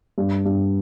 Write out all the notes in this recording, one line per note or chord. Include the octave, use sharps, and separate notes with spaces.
G2
G2